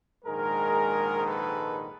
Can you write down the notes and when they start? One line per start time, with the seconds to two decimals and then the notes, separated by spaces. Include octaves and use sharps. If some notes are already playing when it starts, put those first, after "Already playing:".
0.25 A#1 G#2 D#3 G#3 G#4 A#4
1.25 A4 B4